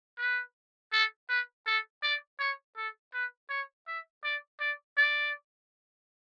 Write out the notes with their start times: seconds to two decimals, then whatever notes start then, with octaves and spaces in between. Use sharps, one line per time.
0.18 B4
0.93 A4
1.29 B4
1.66 A4
2.03 D5
2.40 C#5
2.77 A4
3.14 B4
3.50 C#5
3.87 E5
4.24 D5
4.60 D5
4.98 D5